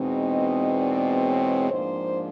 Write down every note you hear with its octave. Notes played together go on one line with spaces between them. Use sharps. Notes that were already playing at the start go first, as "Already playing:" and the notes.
Already playing: E2 B2 G#3 C4 D#4
D#5
D5
C#5
G#2 F3 A#3 D4 C5